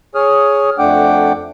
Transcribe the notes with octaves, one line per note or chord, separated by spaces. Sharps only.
G#4 C#5 D#6 F6
F2 A3 D4 F#5 G5 D6